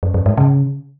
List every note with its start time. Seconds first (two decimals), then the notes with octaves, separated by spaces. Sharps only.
0.03 F#2
0.14 F#2
0.26 G#2
0.38 C#3